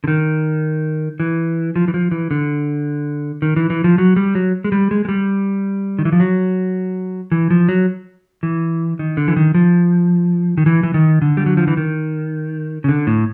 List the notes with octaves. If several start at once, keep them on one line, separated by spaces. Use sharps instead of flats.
D3
D#3
E3
F3
E3
F3
E3
D3
D#3
E3
E3
F3
F#3
G3
F#3
G#3
G3
G#3
G#3
G3
D#3
E3
F3
F#3
E3
F3
F#3
E3
D#3
D3
E3
D#3
F3
D#3
E3
E3
D#3
D3
G3
F#3
F3
E3
D#3
C#3
D3
A2